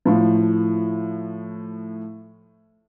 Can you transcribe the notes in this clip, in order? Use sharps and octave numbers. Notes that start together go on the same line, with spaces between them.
A2 F3